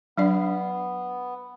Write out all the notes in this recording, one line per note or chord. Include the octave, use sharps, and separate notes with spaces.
F#3 B3 D4 D5